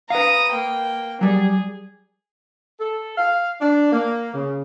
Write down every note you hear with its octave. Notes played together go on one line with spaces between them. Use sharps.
B4 F5 A#5 D#6
A#3 G5
F#3 G3 G#4
A4
F5
D4
A#3
C#3